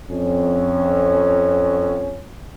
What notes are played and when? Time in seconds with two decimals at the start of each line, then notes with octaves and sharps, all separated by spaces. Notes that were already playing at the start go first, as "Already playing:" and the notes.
0.11 F2 C#4